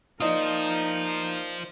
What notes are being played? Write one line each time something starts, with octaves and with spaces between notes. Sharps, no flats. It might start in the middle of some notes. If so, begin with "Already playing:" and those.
A#3 D#4 F4 C5 D5 D#5 D#6